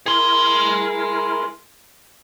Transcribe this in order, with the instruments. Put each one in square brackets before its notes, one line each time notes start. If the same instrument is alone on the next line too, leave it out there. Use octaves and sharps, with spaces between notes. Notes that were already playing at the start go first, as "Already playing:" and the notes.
[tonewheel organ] E4 A#4 [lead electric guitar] G#4 C6